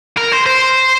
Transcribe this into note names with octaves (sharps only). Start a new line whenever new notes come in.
A#4
C5
C5